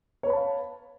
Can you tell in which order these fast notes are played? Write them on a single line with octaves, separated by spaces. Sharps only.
C#5 B4 B5 A5 F5